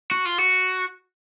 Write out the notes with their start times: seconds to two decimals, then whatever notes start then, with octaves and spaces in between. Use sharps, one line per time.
0.11 F#4
0.25 F4
0.38 F#4